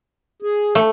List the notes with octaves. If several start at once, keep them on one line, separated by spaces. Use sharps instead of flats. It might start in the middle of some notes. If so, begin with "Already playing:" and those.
G#4
A3